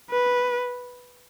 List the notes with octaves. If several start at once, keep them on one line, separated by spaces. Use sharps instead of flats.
B4